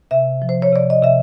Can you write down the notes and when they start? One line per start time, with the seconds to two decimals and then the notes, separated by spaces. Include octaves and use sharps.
0.11 C3 E5
0.42 F3
0.49 C5
0.62 C#5
0.73 C3 D5
0.90 D#5
1.03 C3 E5